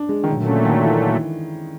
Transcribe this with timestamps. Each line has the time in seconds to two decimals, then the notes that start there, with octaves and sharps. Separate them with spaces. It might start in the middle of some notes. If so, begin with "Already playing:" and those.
Already playing: D4
0.09 G#3
0.24 D#3
0.28 A#2 D3 F#3 A3
0.46 C#3
0.65 D#3
0.84 E3